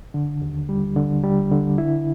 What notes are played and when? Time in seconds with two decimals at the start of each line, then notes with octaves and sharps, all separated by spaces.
0.14 D3
0.42 D#2
0.69 G3
0.96 D3
1.23 G3
1.51 D3
1.78 E4